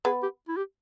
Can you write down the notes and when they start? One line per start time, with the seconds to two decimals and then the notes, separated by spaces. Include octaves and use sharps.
0.05 B3 G#4 B4
0.23 G4
0.48 E4
0.57 G4